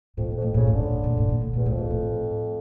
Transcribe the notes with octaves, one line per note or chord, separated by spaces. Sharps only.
F2 A2
A#2
F2 A2
A#2 C#3
A2
A#2 D3
A2
A#2
A2
A#2
A2
E2 A#2
F2 A2
A#2
A2